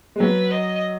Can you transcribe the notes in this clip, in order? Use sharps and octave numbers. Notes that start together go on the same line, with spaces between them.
G#3
F#3 B4
D#5